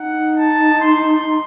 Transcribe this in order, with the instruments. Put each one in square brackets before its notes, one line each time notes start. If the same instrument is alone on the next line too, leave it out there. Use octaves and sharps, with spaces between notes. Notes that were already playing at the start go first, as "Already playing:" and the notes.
Already playing: [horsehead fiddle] D#4 [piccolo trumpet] F#5
[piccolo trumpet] A5
C6